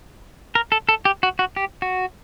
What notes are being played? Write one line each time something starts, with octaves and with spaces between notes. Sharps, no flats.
A#4
A4
A4
G4
F#4
F#4
G4
F#4